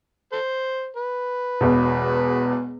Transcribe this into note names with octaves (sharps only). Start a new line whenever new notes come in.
A4 C5
B4
E1 E2 B2